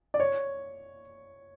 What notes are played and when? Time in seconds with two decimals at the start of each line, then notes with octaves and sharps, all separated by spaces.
0.14 D5
0.20 C#5